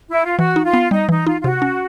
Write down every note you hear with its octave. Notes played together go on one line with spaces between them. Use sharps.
E4
F4
E3 F#4
D#4
F4
B3
G3 D#4
E3 D#4
D#4 F4
F4
C3 F#4
C#4